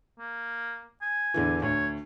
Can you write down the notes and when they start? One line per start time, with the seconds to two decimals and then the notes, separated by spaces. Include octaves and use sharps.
0.19 A#3
1.01 G#5
1.34 E2 D3 E3
1.62 D2 C#5